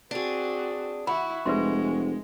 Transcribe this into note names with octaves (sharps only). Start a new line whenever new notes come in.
C4 D4 F#4 G#4
E4 F#4 B5
F1 G#3 B4 E5 C6